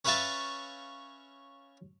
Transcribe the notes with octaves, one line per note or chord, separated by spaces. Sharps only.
C#4 B4 C#5 E5 F5 A5